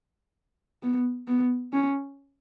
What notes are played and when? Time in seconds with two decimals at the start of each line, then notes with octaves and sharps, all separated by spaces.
0.83 B3
1.28 B3
1.73 C#4